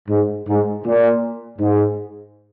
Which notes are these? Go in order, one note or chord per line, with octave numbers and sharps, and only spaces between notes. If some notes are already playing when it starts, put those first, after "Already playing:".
G#2
G#2
A#2
G#2